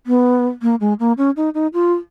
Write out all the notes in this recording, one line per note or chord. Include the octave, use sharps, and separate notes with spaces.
B3
A#3
G#3
A#3
C#4
D#4
D#4
F4